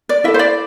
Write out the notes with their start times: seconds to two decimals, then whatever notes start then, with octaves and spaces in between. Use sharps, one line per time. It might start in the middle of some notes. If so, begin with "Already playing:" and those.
0.09 D5
0.24 E4 E5
0.28 A4
0.34 C5
0.39 D5